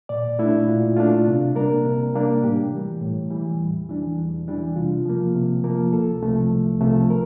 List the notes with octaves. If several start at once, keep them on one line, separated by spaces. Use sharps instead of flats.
A#2 D5
A3 D4 E4
A#2 F4
A3 D4 F4
C3
G3 A#3 D4 A#4
C3
G3 A#3 D4
A2 G4
E3 G3
A2
E3 G3
E2
E3 G3 D4
E2
E3 G3 D4
C3 F4
F3 A#3
C3
F3 A#3
C2 A4
C3 F3 A3
C2
C3 F3 A3
A#4